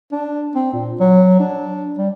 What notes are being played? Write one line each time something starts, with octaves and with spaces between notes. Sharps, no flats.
D4
C4
A#2
F#3
D4
G3